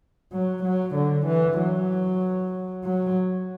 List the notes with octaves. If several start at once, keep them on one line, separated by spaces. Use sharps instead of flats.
F#3
F#3
D3
E3
F#3
F#3